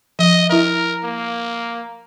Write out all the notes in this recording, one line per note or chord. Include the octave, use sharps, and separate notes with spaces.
F3 D#5
E4 A#4 E5
A#3